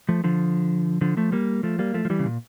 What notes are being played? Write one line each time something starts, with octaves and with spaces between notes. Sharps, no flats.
F3 A3
D3 F3
D3 F3
F3 A3
G3 A#3
F3 A3
G3 A#3
F3 A3
F3
E3 G3
C#3
A#2